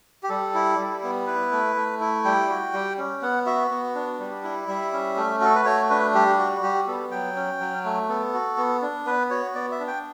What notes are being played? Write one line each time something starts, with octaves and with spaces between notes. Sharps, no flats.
G4
G3 A4
E4
G3
B3
E4 B4
A3
A3
E4
G3 G5
F#4
G3
C#4
B3 F#5
F#4 E5
B3
D4
G3
E4
G3 E5
C#4
A3
F#4 A4
B4
A3 C#5
D4 B4
G3 G4
F#4
G3 G4
B3 A4
F#3 G5
C#4
F#3
A3
B3 A4
F#4
B3
D4
B3 B4
F#4 C#5
B3 D5
E5
D4
G5